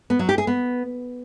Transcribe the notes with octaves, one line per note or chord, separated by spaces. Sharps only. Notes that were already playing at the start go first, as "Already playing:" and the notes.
B3
F#3
G4
G#4
B3